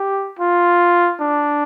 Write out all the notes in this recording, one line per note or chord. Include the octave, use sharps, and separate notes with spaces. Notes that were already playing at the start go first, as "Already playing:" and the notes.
Already playing: G4
F4
D4